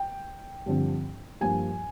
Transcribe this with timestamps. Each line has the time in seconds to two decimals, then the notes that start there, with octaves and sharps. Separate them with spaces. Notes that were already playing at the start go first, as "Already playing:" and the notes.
Already playing: G5
0.66 G2 D3 F3 C4
1.41 G2 F3 A#3 G#5